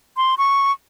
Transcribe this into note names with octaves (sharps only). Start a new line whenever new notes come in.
C6
C#6